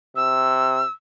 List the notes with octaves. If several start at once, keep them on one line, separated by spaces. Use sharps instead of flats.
C3 E6